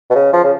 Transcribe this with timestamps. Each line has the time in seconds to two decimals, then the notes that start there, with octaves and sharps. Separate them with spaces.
0.10 B2
0.15 C#3
0.33 F3
0.44 C#3